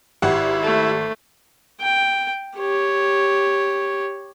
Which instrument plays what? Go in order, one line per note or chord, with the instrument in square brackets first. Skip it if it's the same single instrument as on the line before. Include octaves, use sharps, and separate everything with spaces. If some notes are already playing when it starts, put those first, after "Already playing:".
[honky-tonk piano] G#1 F#5 [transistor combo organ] E4 [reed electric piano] G4
[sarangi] A3
[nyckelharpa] G5
G4 C#5